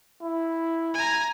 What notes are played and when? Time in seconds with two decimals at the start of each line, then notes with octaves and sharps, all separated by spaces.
0.22 E4
0.94 G#5 A#5